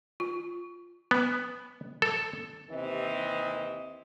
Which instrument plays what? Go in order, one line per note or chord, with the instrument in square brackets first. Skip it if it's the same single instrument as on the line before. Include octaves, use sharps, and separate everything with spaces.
[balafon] F4
[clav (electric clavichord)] B3
A4
[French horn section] D#2 C3 E3 C4 D#5